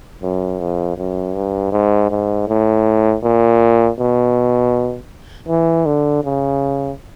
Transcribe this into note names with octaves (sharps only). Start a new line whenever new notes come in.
F#2
F2
F#2
G2
G#2
G#2
A2
A#2
B2
E3
D3
C#3